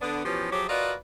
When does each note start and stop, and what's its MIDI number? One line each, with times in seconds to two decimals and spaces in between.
0.01 0.23 50
0.01 0.23 59
0.01 0.23 62
0.25 0.48 47
0.25 0.48 52
0.25 0.48 53
0.25 0.48 61
0.25 0.48 67
0.51 0.64 53
0.51 0.64 54
0.51 0.64 67
0.51 0.64 68
0.51 0.64 73
0.69 0.92 65
0.69 0.92 66
0.69 0.92 70
0.69 0.92 71
0.69 0.92 74
0.69 0.92 75